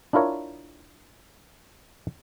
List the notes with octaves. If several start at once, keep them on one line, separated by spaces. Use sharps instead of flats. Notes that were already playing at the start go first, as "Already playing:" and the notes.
D4 E4 F4 A#4 C#5